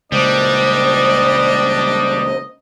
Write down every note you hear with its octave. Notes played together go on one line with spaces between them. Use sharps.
C#2 A#2 G3 D4 C5 D#5